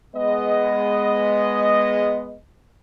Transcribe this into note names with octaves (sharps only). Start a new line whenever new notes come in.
G#3 B3 D#5